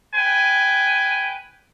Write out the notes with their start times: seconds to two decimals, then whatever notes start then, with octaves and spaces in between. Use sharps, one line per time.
0.15 B4 G5 G#5